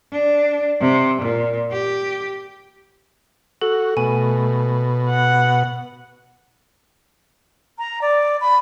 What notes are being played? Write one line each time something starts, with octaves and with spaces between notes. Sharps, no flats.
D4
C3
A#2
G4
F#4 A4
B2 A3 G#5
F#5
A#5
D5
B5